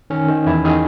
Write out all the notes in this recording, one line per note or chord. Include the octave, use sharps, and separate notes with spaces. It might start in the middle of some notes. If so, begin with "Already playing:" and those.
D#3 C#4
D#3
E2 E4
D#3 G#4